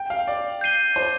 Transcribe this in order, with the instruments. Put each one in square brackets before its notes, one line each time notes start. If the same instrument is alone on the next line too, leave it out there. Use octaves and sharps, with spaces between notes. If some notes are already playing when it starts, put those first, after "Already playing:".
Already playing: [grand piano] G5
F5
D5
[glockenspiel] G6 C7 D#7 G7
[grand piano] C5